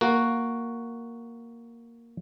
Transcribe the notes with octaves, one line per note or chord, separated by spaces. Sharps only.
A#3 F#4